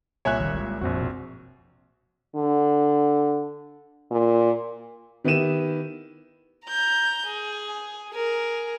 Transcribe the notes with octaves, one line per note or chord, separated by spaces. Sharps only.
C2 A#2 C#5 E5 G#5 F#6
D#3 G#3
G#3
A#1 F2 C4 F#4
B2
D3
A#2
D#3 B3 E4 G4 D#7 E7
A#5 G6
G#4
G#4 A#4